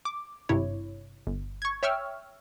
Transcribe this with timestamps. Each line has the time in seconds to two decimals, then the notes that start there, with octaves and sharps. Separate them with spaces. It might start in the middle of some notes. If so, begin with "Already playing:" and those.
0.05 D6
0.49 G#1 G2 C3 E4 C#5
1.27 G1
1.62 C#6 G#6
1.83 C#5 E5 G5 C#6 E6 F6